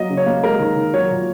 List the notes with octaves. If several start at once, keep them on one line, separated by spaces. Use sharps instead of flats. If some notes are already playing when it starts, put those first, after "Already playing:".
Already playing: F#3 A#3 D#5
C#3
C#5
A#3
G#3 A#4
D#3
D#3
F#3 C#5
A#2